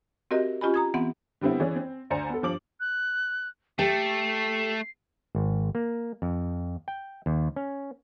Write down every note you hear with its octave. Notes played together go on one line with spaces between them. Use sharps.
C4 F#4 G4 A#4 D#5 E5
C#4 F4 G4 D#5 G#5 B5
A#5 D#6 G#6
E3 B3 C4 E5 F#5 C6
D3 G3 B3 C4 E4
E3 C#4 G#4 D5
C4
D2 C5 D5 G#5 A#5 C#7
B3 A4
G2 F3 D6 F#7
F#6
A3 G4 A4 C7
G#1
A#3
F2
G5
D#2
C#4